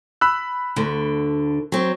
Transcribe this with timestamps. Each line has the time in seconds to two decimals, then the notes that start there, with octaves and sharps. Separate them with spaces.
0.21 B5 E6 F#6
0.76 D2 D3
1.72 F#3 C4